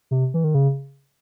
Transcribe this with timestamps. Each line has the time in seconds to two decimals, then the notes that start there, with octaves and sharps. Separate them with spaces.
0.11 C3
0.34 E3
0.44 D#3
0.54 C#3